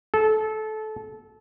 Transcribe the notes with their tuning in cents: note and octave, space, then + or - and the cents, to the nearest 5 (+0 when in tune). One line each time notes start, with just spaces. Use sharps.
A4 -20